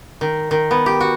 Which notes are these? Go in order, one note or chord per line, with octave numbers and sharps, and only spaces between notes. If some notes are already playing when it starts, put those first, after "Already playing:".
D#3
D#3
B3
G4
F#4